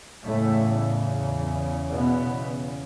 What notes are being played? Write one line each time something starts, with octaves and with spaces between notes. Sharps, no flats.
E2 A2 C#3 A3
B2 B3